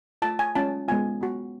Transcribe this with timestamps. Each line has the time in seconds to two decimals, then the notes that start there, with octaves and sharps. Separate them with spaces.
0.22 A3 F4 A5
0.39 G#5
0.55 G#3 C#4 F4 A5
0.88 G#3 B3 F4 G#5
1.21 B3 F#4